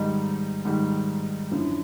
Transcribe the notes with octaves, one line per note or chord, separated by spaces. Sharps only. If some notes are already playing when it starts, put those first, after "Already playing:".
Already playing: G#2 D#3 G3 D#4
G#2 D#3 G3
F#2 D3 F3 E4